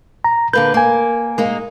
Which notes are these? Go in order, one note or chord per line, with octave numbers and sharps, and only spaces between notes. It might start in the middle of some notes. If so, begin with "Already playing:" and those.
A#5
D3 A#3 B4 G6
A#3 A#4 G#5
G#3 A#3 D#4